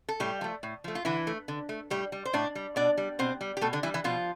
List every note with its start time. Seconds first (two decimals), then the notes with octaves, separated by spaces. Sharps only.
0.08 A4
0.20 A2 G3 G4
0.41 F3 A3
0.63 A2
0.84 F3 A3
0.95 F4
1.05 D3 E3 E4
1.27 A3
1.48 D3
1.69 A3
1.90 A2 G3 G4
2.12 G3
2.25 C5
2.33 A2 D4 D5
2.55 G3
2.76 B2 D4 D5
2.98 G3
3.19 B2 C4 C5
3.41 G3
3.57 G4
3.61 B2 A3 A4
3.73 D3 D4
3.83 E3 G3 E4
3.94 E3 E4
4.04 B2 F3 F4